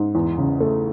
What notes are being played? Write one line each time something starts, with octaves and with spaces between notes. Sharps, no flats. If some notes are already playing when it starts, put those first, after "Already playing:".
Already playing: G#2
E2
C#3
A3